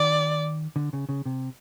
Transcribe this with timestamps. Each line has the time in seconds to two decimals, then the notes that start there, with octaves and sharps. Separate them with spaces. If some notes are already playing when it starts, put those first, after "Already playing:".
Already playing: D#3 D5
0.76 D3
0.93 C#3
1.09 C#3
1.26 C3